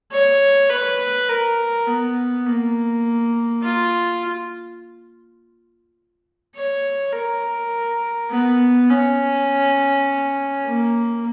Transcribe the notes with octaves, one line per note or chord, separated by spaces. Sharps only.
C#5
B4
A#4
B3
A#3
F4
C#5
A#4
B3
C#4
A#3